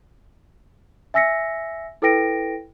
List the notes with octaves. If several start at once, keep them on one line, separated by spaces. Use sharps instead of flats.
E5 G#5 E6 A#6 B6 C#7
E4 A4 B4 G5 A#6 D7